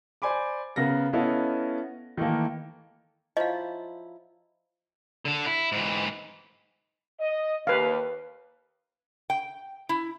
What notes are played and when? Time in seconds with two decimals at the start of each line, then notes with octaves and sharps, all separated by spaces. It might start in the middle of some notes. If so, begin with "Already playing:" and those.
0.22 C5 D5 G#5 B5 D6
0.76 C#3 B3 A#4 A#6
1.13 B3 C#4 E4 A4 D#5 F5
2.17 D#3 E3 A3 A#3
3.37 F3 F#3 E4 D#5 F5
5.25 D3 A4
5.46 E4
5.72 G#2 E3
7.20 D#5
7.67 D#2 B4 F5
9.30 G5
9.89 E4